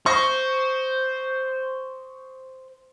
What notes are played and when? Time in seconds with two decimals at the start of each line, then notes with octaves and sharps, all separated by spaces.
0.06 C5 C#6 D#6 A#6